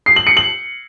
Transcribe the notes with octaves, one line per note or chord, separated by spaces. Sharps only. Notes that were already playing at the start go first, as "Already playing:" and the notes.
C7
F#7
C#7
F#7